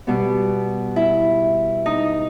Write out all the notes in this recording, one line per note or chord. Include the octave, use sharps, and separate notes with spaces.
B2 G3 B3
E4
D#4